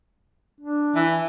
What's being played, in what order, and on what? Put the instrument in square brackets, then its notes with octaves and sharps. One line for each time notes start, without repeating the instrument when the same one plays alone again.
[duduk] D4
[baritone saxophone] E3